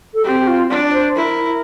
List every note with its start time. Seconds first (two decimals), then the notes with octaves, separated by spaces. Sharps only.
0.13 A4
0.24 C4 G4
0.40 G4
0.47 F4
0.70 D4 D5
0.82 D5
0.93 C5
1.16 E4 A#4